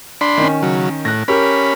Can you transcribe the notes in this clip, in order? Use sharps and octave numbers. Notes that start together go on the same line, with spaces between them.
D4 B5 C6
D#3 C#4
C#3 F#3
A2 F#6 A#6
C#4 G4 A#4 B5